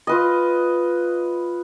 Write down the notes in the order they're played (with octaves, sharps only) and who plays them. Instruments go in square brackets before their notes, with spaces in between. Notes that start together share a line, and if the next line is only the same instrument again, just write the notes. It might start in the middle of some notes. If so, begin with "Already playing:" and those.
[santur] F4 B4 D#5